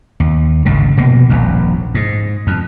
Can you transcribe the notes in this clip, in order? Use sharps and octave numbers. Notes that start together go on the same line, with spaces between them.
D#2
G#1 C#2 D3
F1 B2 A#3
D#1 A#1 F2
G#2
F2